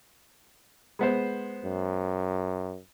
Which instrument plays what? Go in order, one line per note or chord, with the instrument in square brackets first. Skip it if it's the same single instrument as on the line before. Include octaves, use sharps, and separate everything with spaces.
[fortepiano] G#3 B3 C5
[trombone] F#2